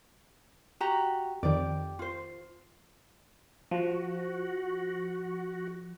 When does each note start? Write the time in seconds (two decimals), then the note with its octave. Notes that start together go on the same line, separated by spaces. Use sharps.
0.80 F#4 G4 A#5
1.43 F2 D#3 G4 D5
1.99 F4 C5
3.71 F3 F#4